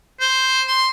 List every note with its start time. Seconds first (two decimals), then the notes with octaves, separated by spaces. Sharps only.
0.21 C5
0.68 C6